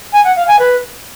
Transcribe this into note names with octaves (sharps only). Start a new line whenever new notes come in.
G#5
F#5
F5
G#5
B4